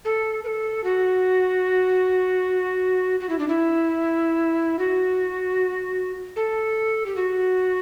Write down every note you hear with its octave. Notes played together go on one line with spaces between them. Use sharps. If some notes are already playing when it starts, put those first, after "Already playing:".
A4
B4
A4
F#4
F#4
E4
D4
E4
F#4
A4
G4
F#4